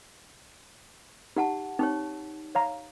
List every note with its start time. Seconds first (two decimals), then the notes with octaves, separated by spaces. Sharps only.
1.37 D#4 G4 F#5 A5
1.79 C4 D#4 G4 C#5
2.55 C#5 F5 A#5